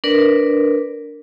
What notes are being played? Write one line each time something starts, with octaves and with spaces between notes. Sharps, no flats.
D4 A#4 B4 D5